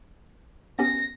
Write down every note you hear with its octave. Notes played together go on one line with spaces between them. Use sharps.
B3 C#4 G4 A#6